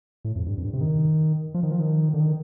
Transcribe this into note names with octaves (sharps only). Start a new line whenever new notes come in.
A2
F2
G2
F2
G2
C3
D#3
F3
D#3
F3
D#3
D3
D#3